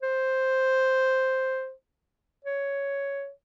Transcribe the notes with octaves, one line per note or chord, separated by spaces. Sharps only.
C5
C#5